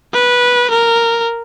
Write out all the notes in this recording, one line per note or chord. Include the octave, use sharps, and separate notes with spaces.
B4
A#4